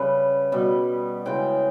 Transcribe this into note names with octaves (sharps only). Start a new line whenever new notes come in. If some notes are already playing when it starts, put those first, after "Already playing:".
Already playing: C#3 G3 B4
B2 G3
C#3 E3 G#3 G5